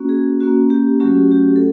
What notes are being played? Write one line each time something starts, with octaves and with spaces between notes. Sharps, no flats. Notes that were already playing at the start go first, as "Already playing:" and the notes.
Already playing: A#3 C#4 F#4
G#4
A#3 C#4 F#4
G4
F#3 A3 C#4 F#4 G4
G4
A4